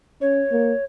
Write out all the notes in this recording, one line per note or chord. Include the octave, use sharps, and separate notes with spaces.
C#4 C#5
A#3